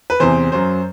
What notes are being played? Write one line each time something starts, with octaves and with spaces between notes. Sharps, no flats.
B4
E2 C3 E3 C5
F#2 F#3 C5